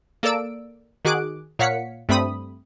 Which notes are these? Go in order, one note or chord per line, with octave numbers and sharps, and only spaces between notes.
A#3 A4 A#4 D5 E6 D7
D#3 F#4 G#4 D6 F#6 D7
A#2 C#5 F5 F#5 B6 C#7
G2 A3 C4 B5 D#6